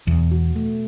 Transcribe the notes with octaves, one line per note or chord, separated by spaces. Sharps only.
E2 B2
F#4
A3